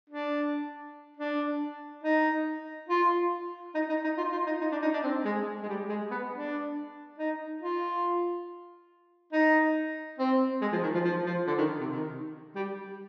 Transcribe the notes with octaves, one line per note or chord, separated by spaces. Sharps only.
D4
D4
D#4
F4
D#4
D#4
D#4
F4
F4
D#4
D#4
D4
D#4
D4
C4
G#3
G#3
G3
G#3
B3
D4
D#4
F4
D#4
C4
G#3
F3
D#3
F3
F3
F3
D3
D#3
C3
D#3
G3